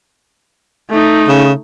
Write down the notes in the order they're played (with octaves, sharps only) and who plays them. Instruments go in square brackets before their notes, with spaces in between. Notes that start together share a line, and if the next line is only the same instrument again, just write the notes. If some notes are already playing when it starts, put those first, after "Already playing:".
[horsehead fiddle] A3 D#4
[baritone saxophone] C#3